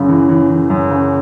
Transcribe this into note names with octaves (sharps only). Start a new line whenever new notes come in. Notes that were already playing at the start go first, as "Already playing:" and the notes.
Already playing: F#2 C#3
E3
E3
E3
F#2
C#3